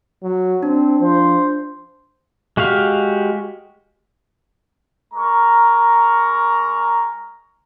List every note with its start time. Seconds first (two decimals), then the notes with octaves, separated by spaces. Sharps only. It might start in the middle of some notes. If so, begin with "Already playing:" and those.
0.23 F#3
0.63 C4 D4
1.00 F3 C5
2.57 G#3 F#4 G4 F5
5.14 G#3 A#4 A#5 C#6